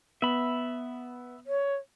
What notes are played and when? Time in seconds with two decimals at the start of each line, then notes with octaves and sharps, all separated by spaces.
0.22 B3 E5 B5
1.47 C#5